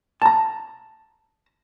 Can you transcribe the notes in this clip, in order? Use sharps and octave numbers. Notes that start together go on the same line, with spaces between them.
A5 A#5